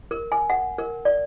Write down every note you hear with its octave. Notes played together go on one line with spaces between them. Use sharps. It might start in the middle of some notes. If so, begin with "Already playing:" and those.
A#4
G#5
F#5
A#4
D5